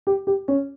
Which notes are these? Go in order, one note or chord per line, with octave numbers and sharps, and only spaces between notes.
G4
G4
C#4